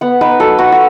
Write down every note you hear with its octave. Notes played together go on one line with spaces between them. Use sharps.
B3 F#5
D#4 B4
F#3 A4
F#3 F#4
F#4